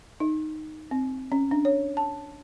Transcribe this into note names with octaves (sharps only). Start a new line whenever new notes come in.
D#4
C4
C#4
D4
C#5
A5